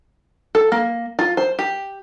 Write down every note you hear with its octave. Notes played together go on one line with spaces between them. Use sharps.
A4
A#3
F4
C5
G4